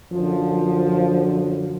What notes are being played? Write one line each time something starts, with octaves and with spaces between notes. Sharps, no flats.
F#2 D3 F3